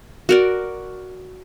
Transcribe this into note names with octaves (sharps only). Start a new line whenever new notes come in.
F#4 A#4 D5